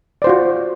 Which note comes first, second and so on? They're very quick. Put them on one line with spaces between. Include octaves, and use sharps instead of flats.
D5 C5 F4 F#4